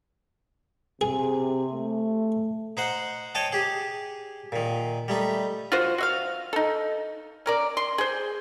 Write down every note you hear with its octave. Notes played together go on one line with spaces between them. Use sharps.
C3 G#4
A3
D#4 C5 F#5
C#5 D#5 G5 A5
G4 G#4
A#2 D#3
G3 A3 D#4
F4 F#4 C5
F#4 E5 F5
D#4 A4
C#4 A#4 D5
C6
G#4 C5